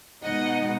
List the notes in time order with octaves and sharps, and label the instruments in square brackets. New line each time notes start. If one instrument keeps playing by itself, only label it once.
[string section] B2 G#3 D#4 D#5 F#5